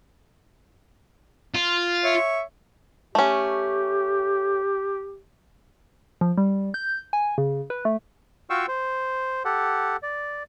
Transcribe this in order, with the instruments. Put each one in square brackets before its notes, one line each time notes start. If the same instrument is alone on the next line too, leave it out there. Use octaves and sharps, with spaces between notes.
[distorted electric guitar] F4
[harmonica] C#5 E5
[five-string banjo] A3 C#4 [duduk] G4
[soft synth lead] F3
G3
G6
G#5
C#3
B4
A3
[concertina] F4 F#4 F5 G5 C#6 E6
C5
G4 A4 F#5
D5